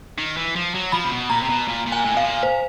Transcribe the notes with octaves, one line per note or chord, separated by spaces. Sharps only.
D#3
E3
F3
F#3
F3 B5
C3
B2
A#2 A#5
C3
B2
A#2
A#2
G#5
A2
B2 F5
A#2
C5